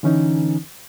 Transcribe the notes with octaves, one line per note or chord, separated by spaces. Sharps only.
D3 E3 C#4 D#4